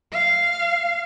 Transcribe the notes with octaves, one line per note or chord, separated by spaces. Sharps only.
F5